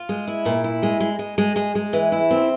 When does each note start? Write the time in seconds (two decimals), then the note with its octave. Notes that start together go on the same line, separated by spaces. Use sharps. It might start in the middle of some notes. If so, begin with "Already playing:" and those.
Already playing: F4
0.09 G#3
0.28 E4
0.46 A#2
0.64 E4
0.83 G#3
1.00 G#3
1.19 G#3
1.38 G#3
1.56 G#3
1.75 G#3
1.93 E3
2.12 E4
2.31 C4